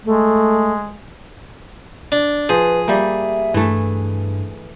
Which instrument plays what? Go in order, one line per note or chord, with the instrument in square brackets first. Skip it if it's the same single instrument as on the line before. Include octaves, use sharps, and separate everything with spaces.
[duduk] G#3 [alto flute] A3
[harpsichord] D4
[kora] F3 [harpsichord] G#4 [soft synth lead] B4
[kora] G3 A#3 [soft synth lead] E5
[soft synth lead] G2 [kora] E3 A3